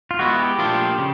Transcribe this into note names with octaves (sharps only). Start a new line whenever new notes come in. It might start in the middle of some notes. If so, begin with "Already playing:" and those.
F4
G#3 B3 E4 F#4
G4
A#2 F3 A3 D4 F4
C#3